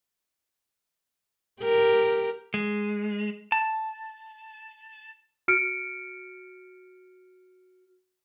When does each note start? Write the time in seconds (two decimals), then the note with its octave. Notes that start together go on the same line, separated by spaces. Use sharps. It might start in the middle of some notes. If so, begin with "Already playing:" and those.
1.61 G4 A#4
2.54 G#3
3.52 A5
5.48 F#4 F6 C#7 D7